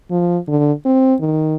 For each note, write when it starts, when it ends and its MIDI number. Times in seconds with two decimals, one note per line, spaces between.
0.11 0.38 53
0.48 0.72 50
0.86 1.15 60
1.20 1.56 51